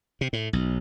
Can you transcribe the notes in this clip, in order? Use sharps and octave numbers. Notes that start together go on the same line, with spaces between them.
C3
A2
B1